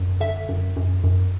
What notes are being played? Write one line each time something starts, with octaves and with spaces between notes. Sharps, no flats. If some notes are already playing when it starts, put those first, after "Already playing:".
Already playing: F#2
D3 E5
F#2
F#2
F#2